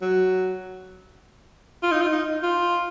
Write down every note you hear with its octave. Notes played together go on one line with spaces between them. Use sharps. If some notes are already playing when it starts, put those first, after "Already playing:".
F#3
F4
D#4
F4
D#4
F4